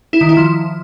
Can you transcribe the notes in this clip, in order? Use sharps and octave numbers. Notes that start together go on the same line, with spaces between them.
E4
D#3
E4
F3